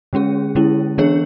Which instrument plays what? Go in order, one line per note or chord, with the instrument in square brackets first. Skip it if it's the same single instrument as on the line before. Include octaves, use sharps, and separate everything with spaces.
[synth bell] D3 G#3 C#4 G#4
D3 G#3 C#4 E4
E3 B3 D4 G#4 C#5